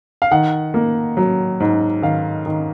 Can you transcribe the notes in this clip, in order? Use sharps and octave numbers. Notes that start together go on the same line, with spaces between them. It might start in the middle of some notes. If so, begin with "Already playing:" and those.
F5
D#3 F#5
A#3
F#3
G#2
D#3 F5
D#3